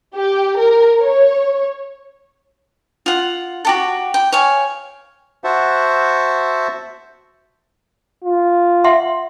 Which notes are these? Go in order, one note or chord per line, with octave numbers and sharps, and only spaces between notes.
G4
A#4
C#5
F4 F#5
F#4 G4 A4
G5
C#5 F5 G#5
F#4 C5 E5 F#5 A5
F4
E5 F#5 C6